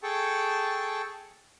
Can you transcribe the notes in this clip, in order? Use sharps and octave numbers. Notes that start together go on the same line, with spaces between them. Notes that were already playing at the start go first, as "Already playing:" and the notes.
G#4 A4 G5 A5 C#6